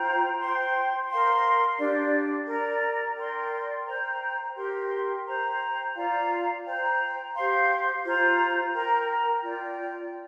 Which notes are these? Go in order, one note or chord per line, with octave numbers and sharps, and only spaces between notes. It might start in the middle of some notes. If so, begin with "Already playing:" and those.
Already playing: F4 C5 G5 A#5
C5 G5 C6
A#4 F5 C6
D4 G4 D5
A#4 D5 A#5
A#4 D5 G5 C6
C5 G5 A#5
G4 A#4 G5 C6
C5 G5 A#5
F4 D5 F5 A#5
C5 G5 A#5
G4 C5 F5 C6
F4 C5 A#5
A#4 G5 A#5
F4 D5 G5